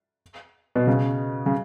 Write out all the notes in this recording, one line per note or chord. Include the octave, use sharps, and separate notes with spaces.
B2
C#3
C#3